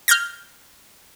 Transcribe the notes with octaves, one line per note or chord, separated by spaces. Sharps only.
F6 G6 G#6 A#6